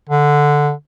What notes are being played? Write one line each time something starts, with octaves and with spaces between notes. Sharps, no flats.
D3